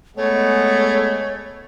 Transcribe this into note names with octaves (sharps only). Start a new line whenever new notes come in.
G#3 A3 B3 C#5